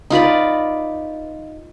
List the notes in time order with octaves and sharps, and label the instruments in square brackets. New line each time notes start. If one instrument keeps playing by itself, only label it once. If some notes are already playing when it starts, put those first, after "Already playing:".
[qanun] D#4 F4 B4 D5